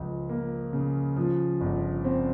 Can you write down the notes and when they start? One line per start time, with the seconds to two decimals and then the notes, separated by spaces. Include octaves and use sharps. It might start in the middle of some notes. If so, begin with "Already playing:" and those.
Already playing: C#2 F3
0.29 A#3
0.73 C#3
1.16 F3
1.61 G1
2.04 C4